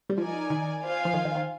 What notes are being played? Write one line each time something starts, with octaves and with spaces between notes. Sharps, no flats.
G3
F3 D#4 A#4 D5 G#5
D#3
F4 C5 F5 G#5
F3
D#3
D#3
D#3